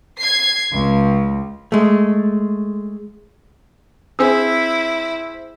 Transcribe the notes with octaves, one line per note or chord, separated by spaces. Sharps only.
G#6 C7
C#2
G#3 A3
C4 E4 G#4 E6